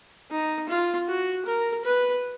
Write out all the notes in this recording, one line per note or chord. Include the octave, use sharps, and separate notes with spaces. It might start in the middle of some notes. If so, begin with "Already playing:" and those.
D#4
F4
F#4
A#4
B4